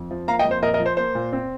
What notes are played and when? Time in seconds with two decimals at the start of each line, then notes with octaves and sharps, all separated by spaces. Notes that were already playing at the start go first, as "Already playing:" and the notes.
Already playing: F2
0.11 F3
0.28 A#3 F5 A#5
0.39 D#5 G5
0.45 F2
0.51 C5
0.62 A#2 A#4 D#5
0.74 A#4 D#5
0.80 F3
0.86 C5
0.97 A#3 C5
1.15 A#2
1.32 C4